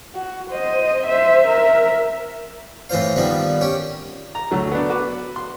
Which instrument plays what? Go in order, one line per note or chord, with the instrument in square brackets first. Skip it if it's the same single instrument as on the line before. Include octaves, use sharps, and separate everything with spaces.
[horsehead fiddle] F#4
C5 D#5
C5 E5
A#4 E5
[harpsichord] A2 E3 F4 C5 F5
D#3 F3 G3 B3
C#4 G4
[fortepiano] A#5
D2 F#3 A3
B3 D4
F#4 B4 D6
C6